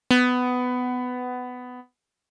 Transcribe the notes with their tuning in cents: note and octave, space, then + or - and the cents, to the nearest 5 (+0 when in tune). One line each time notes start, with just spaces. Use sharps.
B3 +15